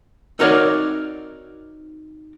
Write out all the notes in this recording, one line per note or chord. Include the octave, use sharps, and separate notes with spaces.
C4 D#4 F#4 A#4 C#5 D5